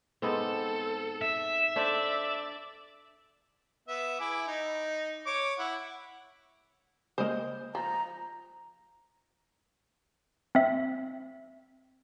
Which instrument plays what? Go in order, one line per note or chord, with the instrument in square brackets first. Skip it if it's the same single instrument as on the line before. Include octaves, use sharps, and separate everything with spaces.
[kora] G#2 B3 C4 [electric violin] A4
[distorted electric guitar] E5
[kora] D4 A4 C5 [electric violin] D5
[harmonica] B3 E5
E4 G#4 D6
D#4
C#5 D6
E4 F#5
[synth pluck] C#3 G#3 A#3 [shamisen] C5 D#5
[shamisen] F3 [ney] A#5
[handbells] C4 E5